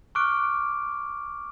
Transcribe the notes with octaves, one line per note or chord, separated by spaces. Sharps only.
C#6 D6 F6 F#6 D7